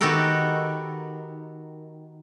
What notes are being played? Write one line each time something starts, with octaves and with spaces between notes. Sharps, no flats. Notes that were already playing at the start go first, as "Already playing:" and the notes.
D#3 B3 F#4 G4 A4 A#4